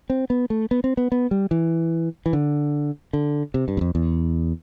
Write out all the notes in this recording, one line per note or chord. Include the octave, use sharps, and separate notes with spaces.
C4
B3
A3
B3
C4
B3
B3
G3
E3
E3
D3
D3
C3
G2
E2
F2
E2